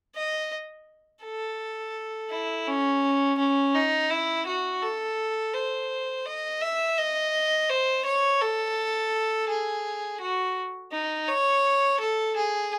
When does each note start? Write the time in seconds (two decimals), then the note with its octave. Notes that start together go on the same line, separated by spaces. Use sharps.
0.16 D#5
1.24 A4
2.30 E4
2.67 C#4
3.38 C#4
3.74 D#4
4.10 E4
4.47 F#4
4.82 A4
5.54 C5
6.26 D#5
6.61 E5
6.98 D#5
7.70 C5
8.05 C#5
8.41 A4
9.49 G#4
10.21 F#4
10.92 D#4
11.28 C#5
12.00 A4
12.36 G#4